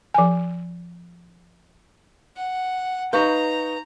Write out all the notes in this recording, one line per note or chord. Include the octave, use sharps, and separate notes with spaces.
F3 G#5
F#5
D#4 B4 F5 A#5 C#6 G6